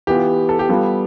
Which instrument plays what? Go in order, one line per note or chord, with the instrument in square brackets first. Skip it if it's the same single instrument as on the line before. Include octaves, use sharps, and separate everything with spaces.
[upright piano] E3 B3 F4 [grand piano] G4
[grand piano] A4
G4
[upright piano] G3 B3 F4 A4